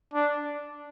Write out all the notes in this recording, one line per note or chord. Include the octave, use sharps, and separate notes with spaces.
D4